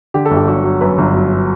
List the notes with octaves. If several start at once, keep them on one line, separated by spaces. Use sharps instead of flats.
D3 G4
A4
G1
G4
F#3 F#4
F#3
F#2 B4
G1
F#3